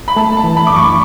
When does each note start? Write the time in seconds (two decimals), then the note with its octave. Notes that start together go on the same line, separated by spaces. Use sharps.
0.08 B5
0.16 A3 A5
0.37 A5
0.44 E3
0.57 B5
0.67 F#2 D6
0.76 C#6